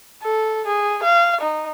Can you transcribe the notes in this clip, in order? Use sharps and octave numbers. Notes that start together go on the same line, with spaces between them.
A4
G#4
F5
D#4